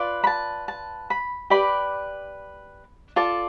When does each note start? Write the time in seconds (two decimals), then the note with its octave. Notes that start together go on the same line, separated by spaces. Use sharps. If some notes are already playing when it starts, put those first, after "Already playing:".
Already playing: F4 B4 D5
0.24 B5
0.27 A5
0.68 A5
1.10 B5
1.50 G4 B4 D5 B5
3.16 F4 A4 D5 A5